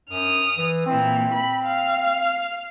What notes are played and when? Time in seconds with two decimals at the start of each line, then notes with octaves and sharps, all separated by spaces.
0.11 F#2 D#6 F6
0.58 E3
0.86 A#2 E3 C4
1.33 B5
1.65 F5